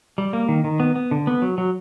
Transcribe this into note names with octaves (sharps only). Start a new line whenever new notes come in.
G3
A#3
D#3
D#3
B3
B3
D3
B3
F#3
F#3